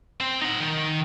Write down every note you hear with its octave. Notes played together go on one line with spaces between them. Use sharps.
C4
D#4 F#5
D#3